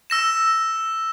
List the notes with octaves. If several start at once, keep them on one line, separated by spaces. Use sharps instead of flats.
E6 A#6 E7